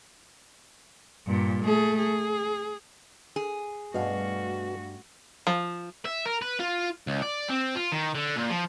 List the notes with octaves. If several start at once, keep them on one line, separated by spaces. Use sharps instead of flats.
G2 A#2
A3 G#4
G#4
G#4
G2 B2 A3 F#4 F5
F3
E5
A#4
B4
F4
C#2
D5
C4
F4
D#3
D3
A#2
F3